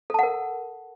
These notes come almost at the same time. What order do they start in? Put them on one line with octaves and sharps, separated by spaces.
A4 A5 F#5 A#4